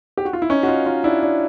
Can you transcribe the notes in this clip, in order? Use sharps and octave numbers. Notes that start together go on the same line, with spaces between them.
G4
F#4
F4
E4
C#4 D#4
F#4
D#4 F4
D#4 F4
D4 E4
D4